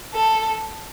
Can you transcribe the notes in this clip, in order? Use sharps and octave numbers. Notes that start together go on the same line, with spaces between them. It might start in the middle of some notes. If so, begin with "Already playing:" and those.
A4